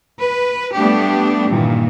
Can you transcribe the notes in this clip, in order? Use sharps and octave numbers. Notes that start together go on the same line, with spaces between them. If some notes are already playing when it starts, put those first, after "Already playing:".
B4
G3 A3 B3 D4 G4
G2 A#2 D#3 E3